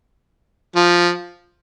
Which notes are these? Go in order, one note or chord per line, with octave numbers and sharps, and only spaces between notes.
F3